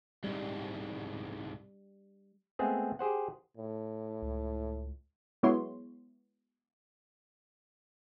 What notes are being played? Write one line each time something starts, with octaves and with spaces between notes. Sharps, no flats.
C2 G#2 G3
G#3 A3 B3 C4 G#4
G4 G#4 C5 F#5
A2
C#2
F#3 G#3 B3 E4 C#5 C6